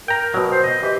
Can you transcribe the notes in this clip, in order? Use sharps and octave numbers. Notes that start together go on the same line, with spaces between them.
A#4 G5 A#5
B2 F#3
C5
D#5
E3 G4